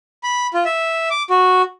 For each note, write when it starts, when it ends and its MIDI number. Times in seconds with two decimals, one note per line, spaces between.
0.23 0.47 83
0.54 0.64 65
0.65 1.09 76
1.10 1.23 86
1.30 1.62 66